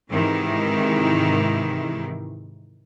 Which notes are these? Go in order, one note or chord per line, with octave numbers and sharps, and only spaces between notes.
G#2 C3 D#3 E3 E4